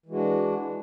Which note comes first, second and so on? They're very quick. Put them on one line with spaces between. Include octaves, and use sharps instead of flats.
E3 G#3 F#4 D4